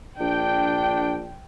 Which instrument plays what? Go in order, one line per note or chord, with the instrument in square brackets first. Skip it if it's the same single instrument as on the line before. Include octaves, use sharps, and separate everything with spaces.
[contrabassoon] A#1 [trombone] D4 [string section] G5